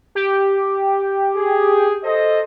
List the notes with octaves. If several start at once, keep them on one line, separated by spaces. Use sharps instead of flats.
G4
G#4
A4 C5 D#5